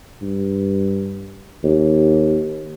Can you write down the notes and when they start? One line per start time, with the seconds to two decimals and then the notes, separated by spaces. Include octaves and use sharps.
0.22 G2
1.64 D#2